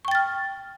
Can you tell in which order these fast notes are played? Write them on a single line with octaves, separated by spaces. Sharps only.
C#6 G5 A6 F6